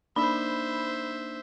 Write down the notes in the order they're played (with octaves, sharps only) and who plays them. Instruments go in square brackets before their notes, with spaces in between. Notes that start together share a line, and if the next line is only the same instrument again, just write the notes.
[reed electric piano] A#3 D4 D#4 [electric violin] C5 E5 [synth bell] B5